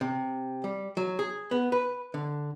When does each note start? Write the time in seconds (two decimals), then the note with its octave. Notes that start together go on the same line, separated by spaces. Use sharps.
0.01 C3
0.64 G3
0.97 F#3
1.19 G#4
1.51 B3
1.72 B4
2.14 D3